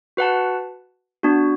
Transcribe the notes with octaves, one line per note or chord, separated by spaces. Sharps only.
F#4 B4 F#5 A5
B3 D4 F#4